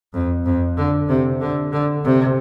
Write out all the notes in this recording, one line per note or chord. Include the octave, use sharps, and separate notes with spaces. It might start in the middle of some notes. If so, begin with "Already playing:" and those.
F2
F2
D3
C3
D3
D3
C3